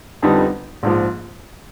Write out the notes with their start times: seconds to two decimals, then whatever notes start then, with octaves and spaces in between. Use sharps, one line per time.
0.22 F2 D3 G3 B3 D#4
0.83 A#1 G#2 F3